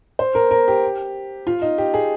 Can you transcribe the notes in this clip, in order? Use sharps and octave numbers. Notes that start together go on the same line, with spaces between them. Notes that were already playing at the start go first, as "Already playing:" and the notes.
C5
A#4
A#4
G4
F4
D#4
G4
G#4